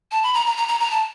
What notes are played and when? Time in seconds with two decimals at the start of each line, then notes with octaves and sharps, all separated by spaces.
0.12 A5
0.23 B5
0.34 A#5
0.46 A#5
0.57 A#5
0.68 A#5
0.80 A#5
0.91 A5